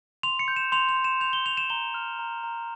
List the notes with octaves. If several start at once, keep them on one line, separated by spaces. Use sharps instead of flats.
C6 F7
C#7
G6
E7
C6 F7
F7
C6
E7
G6 F7
G7
C6 F7
E7
A#5 G7
F6
A#5
A#5